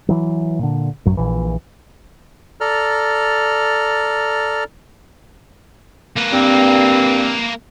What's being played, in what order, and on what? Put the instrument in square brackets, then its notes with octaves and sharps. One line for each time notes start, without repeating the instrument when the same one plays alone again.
[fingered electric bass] E3 F#3
A#2 D3
A1 F#2 F#3
A#1 A#2 E3
[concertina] A4 D5 A#5 F6
[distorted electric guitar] A#3 B4
[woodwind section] G2 C4